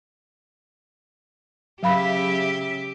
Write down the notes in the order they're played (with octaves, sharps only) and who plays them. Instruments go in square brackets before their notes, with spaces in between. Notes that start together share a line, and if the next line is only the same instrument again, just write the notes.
[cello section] C#3 E5 [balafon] F#3 F5 B5 [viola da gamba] G4